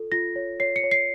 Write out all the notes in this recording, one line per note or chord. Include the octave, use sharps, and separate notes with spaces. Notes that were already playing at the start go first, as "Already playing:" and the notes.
Already playing: F4 A4
F4 A#6
C#5
C#5 C7
C#7
C#5
C7